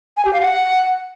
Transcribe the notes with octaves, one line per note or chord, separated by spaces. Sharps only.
G#5
G4
F5
F#5